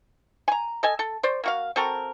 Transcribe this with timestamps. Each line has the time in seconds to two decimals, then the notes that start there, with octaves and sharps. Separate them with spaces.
0.48 G#5 A#5
0.83 A4 D#5 G#5
0.99 A4
1.23 C5 D5
1.44 A#3 F#4 F5
1.76 C4 F#4 A4 A#4